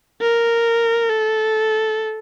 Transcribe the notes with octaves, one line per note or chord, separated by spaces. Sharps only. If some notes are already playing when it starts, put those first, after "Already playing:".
A#4
A4